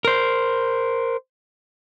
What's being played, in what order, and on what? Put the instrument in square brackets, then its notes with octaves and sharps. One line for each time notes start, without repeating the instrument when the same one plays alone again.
[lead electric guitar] A#4 C5